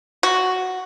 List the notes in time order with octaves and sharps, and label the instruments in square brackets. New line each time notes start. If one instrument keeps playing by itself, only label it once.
[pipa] F#4